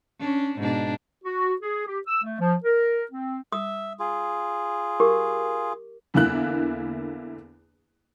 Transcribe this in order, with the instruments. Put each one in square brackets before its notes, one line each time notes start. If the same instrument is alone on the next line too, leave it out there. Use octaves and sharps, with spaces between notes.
[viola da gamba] C#4 D4
G#2 B2 D4
[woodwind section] F#4
G#4
G4
E6
A3
F3
A#4
C4
[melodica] E5 [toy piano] D#6
[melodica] F4 G#4
[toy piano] G4 A#4 D6
[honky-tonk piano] E2 D3 A#3 E4 F#6